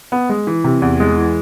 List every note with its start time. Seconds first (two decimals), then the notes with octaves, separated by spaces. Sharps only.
0.12 B3
0.29 G#3
0.47 E3
0.64 C3
0.82 E2
1.00 G#3
1.18 E3